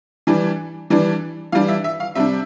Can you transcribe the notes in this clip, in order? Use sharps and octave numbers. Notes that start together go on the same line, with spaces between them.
E3 G3 D4
E3 G3 D4
E3 G3 D4 F5
E5
E5
F5
C3 G3 D4 E5